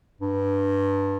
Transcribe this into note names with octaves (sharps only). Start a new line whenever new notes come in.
G2